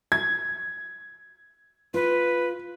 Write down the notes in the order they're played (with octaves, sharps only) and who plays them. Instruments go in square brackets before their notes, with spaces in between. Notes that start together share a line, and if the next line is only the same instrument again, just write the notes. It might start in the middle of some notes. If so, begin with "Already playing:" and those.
[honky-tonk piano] G#6
[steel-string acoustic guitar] F4 [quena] B4